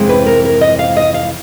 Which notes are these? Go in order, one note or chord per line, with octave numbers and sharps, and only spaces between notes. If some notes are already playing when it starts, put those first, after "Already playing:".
Already playing: F2 C3 E3 G#3 C4
B4
A#4
A#4
D#5
F5
D#5
F5